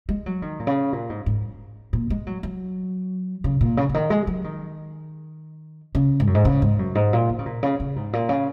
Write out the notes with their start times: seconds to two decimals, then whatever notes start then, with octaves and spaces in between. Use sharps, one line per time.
0.09 G#3
0.26 F#3
0.42 D#3
0.60 A#2
0.67 C#3
0.93 A#2
1.10 G#2
1.26 G#2
1.93 A#2
2.10 G#3
2.27 F#3
2.43 F#3
3.44 C#3
3.61 A#2
3.77 C#3
3.89 C#3
3.94 D#3
4.10 G#3
4.27 F#3
4.44 D#3
5.95 C#3
6.20 G#2
6.27 F#2
6.35 G#2
6.45 C#3
6.62 G#2
6.79 F#2
6.95 G#2
7.13 A#2
7.30 D#3
7.39 C#3
7.46 A#2
7.63 C#3
7.80 C#3
7.96 G#2
8.13 A#2
8.29 C#3